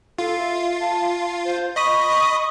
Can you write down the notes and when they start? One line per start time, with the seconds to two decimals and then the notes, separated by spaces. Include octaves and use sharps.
0.19 F4 A4
0.39 E5
0.81 A5
1.26 F5
1.45 C5
1.76 D#5 B5 C#6 D#6